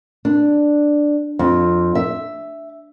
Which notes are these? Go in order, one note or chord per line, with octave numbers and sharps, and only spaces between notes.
D4
F2
E5